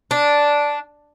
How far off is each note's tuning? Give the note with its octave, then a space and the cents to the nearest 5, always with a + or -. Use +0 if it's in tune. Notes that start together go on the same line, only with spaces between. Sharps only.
D4 -5